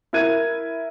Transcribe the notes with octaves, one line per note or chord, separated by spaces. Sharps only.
E4 A#4 E5 G#6 D#7